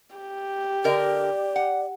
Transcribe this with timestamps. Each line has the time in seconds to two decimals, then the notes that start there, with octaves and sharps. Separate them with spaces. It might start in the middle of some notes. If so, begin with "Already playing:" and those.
0.16 G4
0.84 D3 A#4 D5 D#5
1.56 F#5